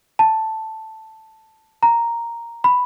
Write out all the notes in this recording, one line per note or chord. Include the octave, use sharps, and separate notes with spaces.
A5
A#5
B5